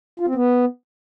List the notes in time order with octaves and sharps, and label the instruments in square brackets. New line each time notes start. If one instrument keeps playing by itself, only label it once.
[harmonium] F4
C4
B3